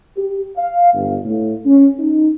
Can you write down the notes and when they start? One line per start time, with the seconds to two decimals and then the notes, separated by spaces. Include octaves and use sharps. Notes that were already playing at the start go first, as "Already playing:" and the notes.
0.17 G4
0.57 F5
0.93 G1
1.25 A2
1.66 C#4
1.99 D#4